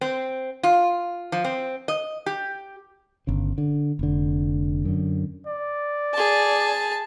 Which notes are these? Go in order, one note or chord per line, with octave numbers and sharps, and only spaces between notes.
C4
F4
F3
C4
D#5
G4
G1 C#3
D3
F1 D3
F#2 D3
D5
G#4 A5